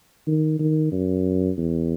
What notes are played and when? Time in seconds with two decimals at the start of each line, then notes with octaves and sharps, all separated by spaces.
0.27 D#3
0.59 D#3
0.92 F#2
1.57 E2